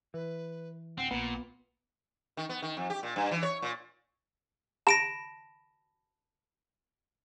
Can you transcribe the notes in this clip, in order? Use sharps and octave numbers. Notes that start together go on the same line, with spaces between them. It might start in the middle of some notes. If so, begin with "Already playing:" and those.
E3 B4
D1 C4 F#5
A#1 A#2 B3
D#3
B3
D#3
F2
G4
A#2
G2
E3
C#5
A#2
A5 B5 A#6 D7 E7